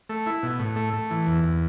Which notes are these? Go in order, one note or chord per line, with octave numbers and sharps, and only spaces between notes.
A3
E4
B2
A2
A3
A3
E3
E2
E2